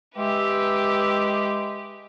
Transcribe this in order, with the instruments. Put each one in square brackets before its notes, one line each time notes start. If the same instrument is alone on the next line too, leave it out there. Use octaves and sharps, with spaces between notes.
[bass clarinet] G#3 [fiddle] G4 B4 [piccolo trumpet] E5